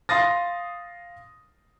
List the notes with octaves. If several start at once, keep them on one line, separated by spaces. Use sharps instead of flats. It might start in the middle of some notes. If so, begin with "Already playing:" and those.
F5 C6 D#6 A6 A#6